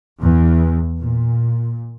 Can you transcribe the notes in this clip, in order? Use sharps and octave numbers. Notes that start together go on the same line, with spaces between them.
E2
A#2